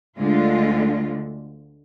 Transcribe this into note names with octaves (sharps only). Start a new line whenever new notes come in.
D2 D3 G#3 F4